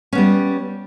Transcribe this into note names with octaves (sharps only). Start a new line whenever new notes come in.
G3 B3 C#4